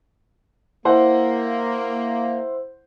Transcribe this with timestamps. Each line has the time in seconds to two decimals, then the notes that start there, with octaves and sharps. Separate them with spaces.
0.85 A#3 E4 C5 F#5